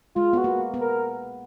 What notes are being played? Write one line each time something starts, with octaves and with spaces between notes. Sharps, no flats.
G#3 F4
B3 F#4
A#3
B3
A#4